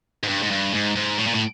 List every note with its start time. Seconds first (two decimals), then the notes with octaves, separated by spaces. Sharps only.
0.23 G#2
0.28 G2
0.42 G#2
0.51 G2
0.74 G#2
0.95 G#2
1.18 A2
1.26 A#2
1.34 A2